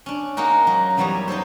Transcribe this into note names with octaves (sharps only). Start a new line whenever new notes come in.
C#4 D4
G#3 A#3 D#4 F#4
F#3
F#2 E3 F#3 G3 B3 C#5
D#4 E4 A4 C5